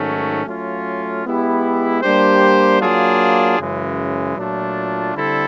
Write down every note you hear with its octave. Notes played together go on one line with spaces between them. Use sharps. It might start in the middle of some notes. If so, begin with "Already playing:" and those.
Already playing: G#2 D#3 F#3 A3 C#4
F#3 A3 C#4 F4
G#3 B3 E4 G4
G3 A#3 D4 G4 C5
F#3 A#3 D4 F4 G#4
F#2 C#3 E3 G#3
A#2 F#3 A3 D4 F4
D3 G3 C4 E4 A4